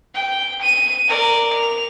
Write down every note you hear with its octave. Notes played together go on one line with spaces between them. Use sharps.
G5
D#7
A#4 D5
F7